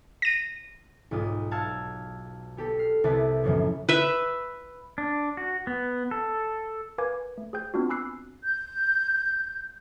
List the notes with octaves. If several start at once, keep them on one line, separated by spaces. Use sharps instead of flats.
A#6 D#7
B1 G#2 F4 D#6
F5 F#5 A5 E6 G#6 A6
B3 G4 A4
F6 C7
C2 C3 E4 B4 F#5 A5
F#2 A2 C#3 E3 F3 B3
B4 E5
D4
F#4
B3
A4
A#4 B4 F5 G#5 D6 G#6
A3
G#4 C5 G5 G6
B3 C4 D4 F4 F#4
G#5 B5 D6 E6 F#6 C7
G6